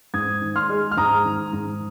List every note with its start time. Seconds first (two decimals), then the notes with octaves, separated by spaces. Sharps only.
0.14 G#2 D#6 G#6
0.41 D#3
0.56 C6 F6
0.69 G#3
0.91 F6
0.97 G#2 A#5 D#6
1.25 D#3
1.53 G#2